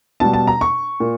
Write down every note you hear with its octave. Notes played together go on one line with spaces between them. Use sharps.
B2 G3 A5
A5
A#5
C#6
A#2